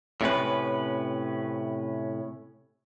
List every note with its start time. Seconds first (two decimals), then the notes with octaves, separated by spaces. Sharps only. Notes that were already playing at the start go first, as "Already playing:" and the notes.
0.21 A2 C3 C#4 B4